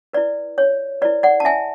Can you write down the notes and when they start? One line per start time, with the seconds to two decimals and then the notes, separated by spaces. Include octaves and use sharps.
0.13 E4 B4 D5
0.58 C#5
1.02 E4 B4 D5
1.23 D5 F#5
1.40 A5
1.45 E5 G#5